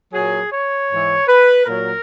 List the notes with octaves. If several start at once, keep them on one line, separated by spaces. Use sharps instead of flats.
A#2 F#3 G#4
C#5
G#2 E3
B4
A#2 F#3 A#4